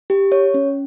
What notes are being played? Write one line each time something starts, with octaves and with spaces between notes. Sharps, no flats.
G4
C#5
C#4